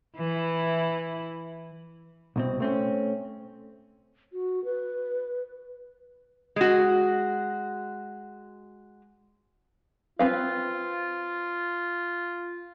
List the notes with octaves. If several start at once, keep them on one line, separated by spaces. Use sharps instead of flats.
E3 E4
C2 B2 C4
A3 C4 C#4
F#4
B4
G#3 F#4
C4 F4 B4 F5